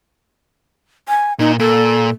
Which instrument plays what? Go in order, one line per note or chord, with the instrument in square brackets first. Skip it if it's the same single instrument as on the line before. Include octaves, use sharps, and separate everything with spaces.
[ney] G#5
[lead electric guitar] A#2 [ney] D#4
[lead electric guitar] A#2 [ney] A4